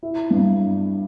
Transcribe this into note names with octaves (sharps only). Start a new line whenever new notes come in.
E4
G2